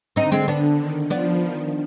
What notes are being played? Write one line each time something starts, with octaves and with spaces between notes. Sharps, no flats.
D3 C4 D#4
G#3 C4
B3 D4
D#3
F3 B3 D4
D#3